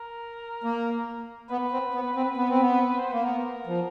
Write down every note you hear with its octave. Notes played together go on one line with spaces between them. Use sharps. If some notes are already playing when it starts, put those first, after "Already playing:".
Already playing: A#4
A#3
B3 B4
C4
B3
C4
B3
C4
B3
C5
A#3 B4
B3 A#4
F3